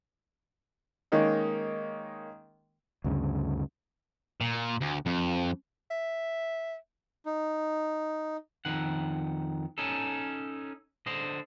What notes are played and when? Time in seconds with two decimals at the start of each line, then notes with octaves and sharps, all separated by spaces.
1.12 D#3 G#3 A#3 C#4 D#4
3.04 D2 G2 C#3
4.41 A#2
4.81 D2
5.06 F2
5.91 E5
7.25 D#4
8.65 F2 D#3 F#5
9.78 C#4 D#4 A4
11.06 D3 C5 D#5